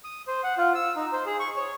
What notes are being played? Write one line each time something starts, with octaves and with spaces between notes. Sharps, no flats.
D#6
C5
F#5
F4
E6
D#4
C5
G#4
C#6
C#5